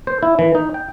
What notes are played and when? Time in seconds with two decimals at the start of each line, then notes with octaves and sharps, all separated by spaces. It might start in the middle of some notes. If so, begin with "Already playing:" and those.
0.07 C5
0.23 E4
0.39 E3
0.55 D#4
0.74 G5